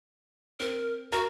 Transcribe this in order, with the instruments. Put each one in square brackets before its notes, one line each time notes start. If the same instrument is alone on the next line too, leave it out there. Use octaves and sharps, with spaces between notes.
[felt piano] C4 [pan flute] A#4
[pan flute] F#4 [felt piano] A#4